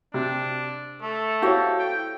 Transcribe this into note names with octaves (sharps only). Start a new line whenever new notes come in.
C3 D4
A3 A4
E4 F#4 G4 C5 C#5 F5
G5